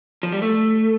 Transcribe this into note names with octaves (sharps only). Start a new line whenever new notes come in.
F3
G3
A3